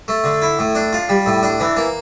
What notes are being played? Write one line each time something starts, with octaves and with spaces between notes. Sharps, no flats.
A3
D3
E4
A2
D4
F4
G3
A2
D4
E3
A#3